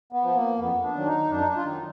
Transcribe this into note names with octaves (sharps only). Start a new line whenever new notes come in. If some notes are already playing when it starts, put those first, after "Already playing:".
B3
F3
A#3
F2 B3
D4
D#3 F#3
D#4
F#2 D4
D#4
D4
F4
D#3 F#3 D#4